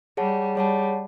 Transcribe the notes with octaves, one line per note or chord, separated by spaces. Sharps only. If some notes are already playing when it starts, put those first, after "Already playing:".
G3 G#4 C#5 F#5 A5
G3 G#4 C#5 F#5 A5